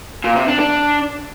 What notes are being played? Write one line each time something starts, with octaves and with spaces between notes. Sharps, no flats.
A#2
C3
D4
D4